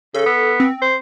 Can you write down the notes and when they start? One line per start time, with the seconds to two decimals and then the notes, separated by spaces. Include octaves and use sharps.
0.15 C#3 A4
0.26 B3
0.60 C4
0.82 C5